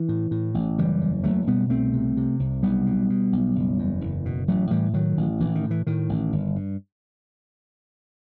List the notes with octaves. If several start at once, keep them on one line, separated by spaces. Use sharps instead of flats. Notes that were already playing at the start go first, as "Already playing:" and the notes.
Already playing: E3
A2
A2
A1
F#1 E3 G3
E2
F#1 F#3 A3
B2 G3 B3
C2 A3 C4
C3
C3
C2
B1 G3 B3
B2
B2
B1
F#1
E2
F#1
B2
A1 F#3 A3
A2 E3 G3
A2 D#3 F#3
A1
A1 E3
D#3
A2
E3
A2 D#3
A1
G1
G2